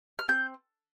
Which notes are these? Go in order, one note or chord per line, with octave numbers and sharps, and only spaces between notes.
F6
C4 G6